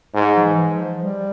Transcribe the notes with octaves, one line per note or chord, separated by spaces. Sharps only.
G#2
F3
E3
F3
G3